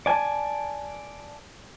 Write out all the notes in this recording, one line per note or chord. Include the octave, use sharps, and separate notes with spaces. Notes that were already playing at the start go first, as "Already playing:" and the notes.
D5 G#5 A5